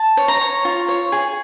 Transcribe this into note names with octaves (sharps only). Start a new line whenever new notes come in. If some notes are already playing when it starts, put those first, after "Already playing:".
Already playing: A5
C#5
A#5
C#5
F4
C#5
G#4